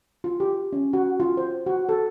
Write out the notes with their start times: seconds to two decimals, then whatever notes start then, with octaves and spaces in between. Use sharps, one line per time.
0.24 F4
0.40 G4
0.73 C#4
0.93 F#4
1.20 F4
1.37 C5
1.66 F#4
1.89 A4